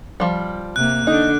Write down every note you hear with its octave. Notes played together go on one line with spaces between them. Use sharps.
F3 G3
C3 A#3 F#6
D3 D4 D#4